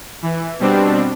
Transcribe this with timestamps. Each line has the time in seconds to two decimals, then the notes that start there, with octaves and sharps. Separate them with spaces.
0.22 E3
0.60 B2 G3 C4 D4